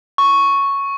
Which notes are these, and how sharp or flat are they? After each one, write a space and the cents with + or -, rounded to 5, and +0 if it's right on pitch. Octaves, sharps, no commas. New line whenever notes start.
C#6 +0